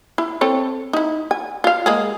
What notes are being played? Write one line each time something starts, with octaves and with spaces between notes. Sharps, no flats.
E4
C4 A4 C#5
D#4 E4
G#5
F4 F5
G#3 A#3 G#4